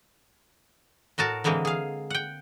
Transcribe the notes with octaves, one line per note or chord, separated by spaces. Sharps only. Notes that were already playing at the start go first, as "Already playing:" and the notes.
A2 F#4 A#4 A5
D3 E3 G#3 A#3 C4
G#4 F5
F#5 G5